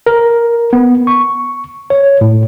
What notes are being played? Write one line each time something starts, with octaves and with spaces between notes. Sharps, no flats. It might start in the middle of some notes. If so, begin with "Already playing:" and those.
A#4
B3
C#6
C#5
A2